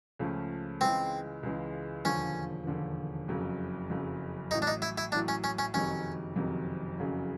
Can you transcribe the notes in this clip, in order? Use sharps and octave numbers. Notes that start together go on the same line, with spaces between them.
C#2 C#3 F3 A3 C#4
C#2 C#3 E3 G#3 C4
C#2 C#3 E3 G#3
E1 D#2 D3 F3 C#4
E1 D#2 D3 F3
F#1 F2 C#3 F#3
F#1 F2 C#3 F#3
A1 A2 F#3 D#4
D4
D#4
E4
E4
A1 A2 F#3 D4
C#4
C#4
C#4
F#1 F2 C3 D#3 F#3 C#4
F#1 F2 C3 D#3 F#3
F#1 F2 C#3 F#3